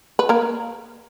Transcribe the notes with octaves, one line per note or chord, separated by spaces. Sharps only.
B4
A#3 A#4